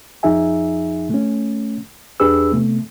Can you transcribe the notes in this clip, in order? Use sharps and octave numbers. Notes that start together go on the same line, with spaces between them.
F2 F3 D#4 G#4 E5 G#5
A3 C#4
E2 D4 G4 G#4 B4 E6
C3 A3 B3